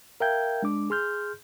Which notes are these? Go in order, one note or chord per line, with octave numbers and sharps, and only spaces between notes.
A#4 E5 F5 G5 G6 G#6
G#3 D4 D6
G#4 C6 F6 G6